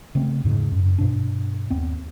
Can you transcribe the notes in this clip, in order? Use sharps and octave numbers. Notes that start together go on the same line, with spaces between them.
C#3 A3 B3 C4
E2 G#2 C#3
F#2
G2 B2 D4
D#2 B3 C4